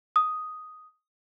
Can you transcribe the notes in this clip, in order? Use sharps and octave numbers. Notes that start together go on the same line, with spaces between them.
D#6